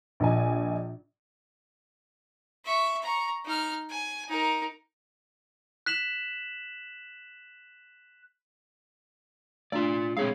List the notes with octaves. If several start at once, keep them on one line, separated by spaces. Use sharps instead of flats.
A#1 D#5 G#5
E5 C#6
A#5 C#6
D#4 F6
G#5
D#4 A#4
F#6 B6 E7 F#7
A3 D4 F4 D5
G#3 C4 G#4 C#5 F5